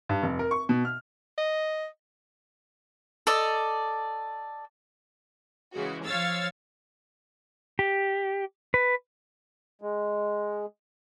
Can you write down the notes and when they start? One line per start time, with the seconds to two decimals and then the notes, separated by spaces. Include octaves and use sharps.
0.09 G2
0.23 F1
0.39 A#4
0.51 C#6
0.69 B2
0.85 F6
1.38 D#5
3.27 A4 D5 D#5
5.75 C#3 E3 G#3 F#4
6.05 F3 C#5 F5 E6 A6
7.79 G4
8.74 B4
9.82 G#3